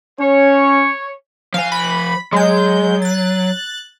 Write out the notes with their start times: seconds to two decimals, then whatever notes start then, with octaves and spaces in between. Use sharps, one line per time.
0.20 C#4 C#5
1.54 F3 F5 G#5
1.72 B5
2.33 F#3 G#3 G6
3.02 F#6 A6